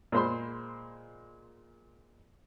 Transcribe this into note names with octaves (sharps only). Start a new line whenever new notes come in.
A#2 G#3 C5 B5 C6